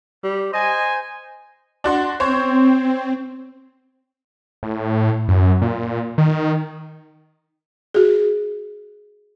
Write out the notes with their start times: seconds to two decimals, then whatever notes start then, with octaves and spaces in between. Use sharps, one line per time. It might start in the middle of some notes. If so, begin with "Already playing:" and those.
0.24 G3
0.53 C5 D#5 G#5
1.84 D4 F#4 C6
2.20 C4 C5 C#5
4.63 A2
5.28 F#2
5.62 A#2
6.18 D#3
7.94 F#4 G#4